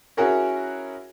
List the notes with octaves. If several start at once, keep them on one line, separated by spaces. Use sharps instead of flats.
C#4 E4 F#4 G#4 A#4 C#5